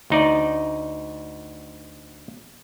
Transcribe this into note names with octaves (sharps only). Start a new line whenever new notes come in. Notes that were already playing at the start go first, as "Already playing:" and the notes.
D2 D#4 D5